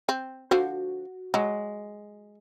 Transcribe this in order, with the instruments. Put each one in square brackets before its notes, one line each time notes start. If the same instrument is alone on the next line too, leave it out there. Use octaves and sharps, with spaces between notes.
[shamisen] C4
[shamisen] D3 F3 C5 [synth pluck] F#4
[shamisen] F#3 [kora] G#3